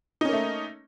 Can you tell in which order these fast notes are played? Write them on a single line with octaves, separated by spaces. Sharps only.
D#4 C#4 A#3 A3